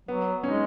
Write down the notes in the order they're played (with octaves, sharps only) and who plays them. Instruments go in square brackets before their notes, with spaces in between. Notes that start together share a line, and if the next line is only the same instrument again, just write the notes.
[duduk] F#3 [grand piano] B3
[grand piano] C#4
[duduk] G#3 [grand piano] D#4